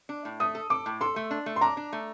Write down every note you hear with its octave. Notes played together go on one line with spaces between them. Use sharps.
D4
A2
A3 D#6
A4
A4 D6
A2
A4 C6
A3
D4
A3
C6
D4 A#5
D4
A3